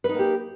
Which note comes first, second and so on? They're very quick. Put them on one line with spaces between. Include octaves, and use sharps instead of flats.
B4 D#4 A#3 G4